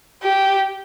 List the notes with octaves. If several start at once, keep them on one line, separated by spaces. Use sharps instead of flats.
G4